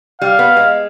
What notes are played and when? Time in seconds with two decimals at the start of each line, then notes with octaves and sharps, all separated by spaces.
0.21 G3 F5
0.39 B3
0.57 G#3